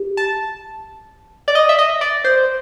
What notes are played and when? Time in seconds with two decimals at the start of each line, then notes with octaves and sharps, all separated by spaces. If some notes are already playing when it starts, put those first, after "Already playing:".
Already playing: G4
0.17 A5
1.48 D5
1.55 D#5
1.69 E5
1.79 D#5
2.01 D5
2.25 C5